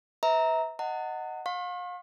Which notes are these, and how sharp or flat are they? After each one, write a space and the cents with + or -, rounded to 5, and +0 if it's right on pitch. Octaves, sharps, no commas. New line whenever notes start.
B4 +20 E5 -30 A#5 +0
D#5 +0 F#5 +0 A#5 -45
F5 +35 C#6 -45